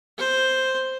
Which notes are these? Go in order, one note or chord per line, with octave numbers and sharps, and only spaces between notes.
C5